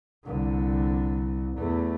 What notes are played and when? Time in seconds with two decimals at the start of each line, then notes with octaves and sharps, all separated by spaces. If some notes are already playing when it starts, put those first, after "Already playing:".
0.24 C2 D3
1.57 E2 A3